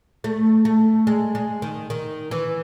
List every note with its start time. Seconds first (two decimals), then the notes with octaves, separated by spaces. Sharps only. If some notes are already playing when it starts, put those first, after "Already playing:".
0.24 A3
0.65 A3
1.07 G#3
1.35 G#3
1.62 D#3
1.90 D#3
2.31 E3